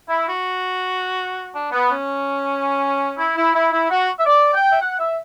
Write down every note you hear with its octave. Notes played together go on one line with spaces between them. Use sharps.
E4
F#4
D4
B3
C#4
E4
E4
E4
E4
F#4
E5
D5
G5
E5
F#5
E5